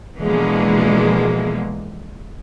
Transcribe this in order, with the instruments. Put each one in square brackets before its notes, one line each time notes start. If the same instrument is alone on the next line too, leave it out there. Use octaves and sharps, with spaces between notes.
[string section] B2 D3 E3 F3 G#3 A#3